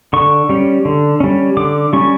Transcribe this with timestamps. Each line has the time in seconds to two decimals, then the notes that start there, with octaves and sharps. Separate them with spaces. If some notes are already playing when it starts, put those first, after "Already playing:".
0.13 D3 C#6
0.49 G3 C#4
0.85 D3
1.20 G3 C#4
1.57 D3 D6
1.93 G3 C#4 C#6